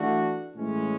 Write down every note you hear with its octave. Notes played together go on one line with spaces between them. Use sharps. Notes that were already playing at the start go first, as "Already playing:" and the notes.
Already playing: E3 A3 D4 F#4
A2 E3 G#3 C#4